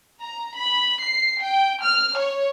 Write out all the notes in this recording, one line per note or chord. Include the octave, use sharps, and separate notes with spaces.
A#5
B5
C7
G5
F6
C#5